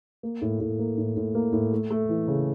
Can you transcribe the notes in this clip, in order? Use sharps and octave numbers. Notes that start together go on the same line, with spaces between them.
A#3
A2
A2
A#3
A2
A2
A#3
A2
A3
A3
E3
C#3